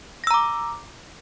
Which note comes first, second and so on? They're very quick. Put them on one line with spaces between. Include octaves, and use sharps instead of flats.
A#6 E6 A#5 D6